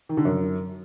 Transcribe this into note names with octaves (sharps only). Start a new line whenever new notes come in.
D#3
D3
F#2